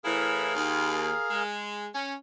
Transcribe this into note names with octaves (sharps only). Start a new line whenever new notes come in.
A2 E3 E4 G#4 A#4 F5
D#2
G#3
C#4